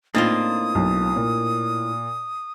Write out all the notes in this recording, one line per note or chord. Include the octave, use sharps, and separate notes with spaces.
A2 A#3 C4 D4 D#4 F4 D#6 A6
B1
A#2